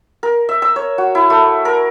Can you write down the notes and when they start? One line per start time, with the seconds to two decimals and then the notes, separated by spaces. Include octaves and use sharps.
0.23 A#4
0.49 E5
0.62 E6
0.76 C#5
0.98 F#4
1.15 E4
1.30 A3
1.65 A#4